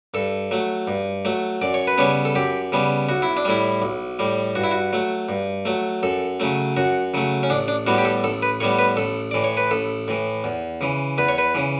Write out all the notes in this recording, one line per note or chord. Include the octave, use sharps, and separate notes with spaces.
G2 A4
F#3 A3
G2
F#3 A3
F#2 D5
C#5
B4
C#3 G3 B3 C#5
A4
F#2 G4
C#3 G3 B3
B1 F#4
E4
D4
A2 G3 E4
B1
A2 G3
G2 F#4
E4
F#4
F#3 A3
G2
F#3 A3
F#2 A4
C#3 F#3 A3
F#2 F#4
C#3 F#3 A3
C#4
A1 D4
D4
A2 G3 B3 F#4
G4
A4
A1 A4
B4
A2 G3 B3 C#5
B4
A1 A4
A2 E3 D5
C#5
B4
A1 A4
A2 E3
E2
C#3 E3
E2 B4
C#5
B4
C#3 E3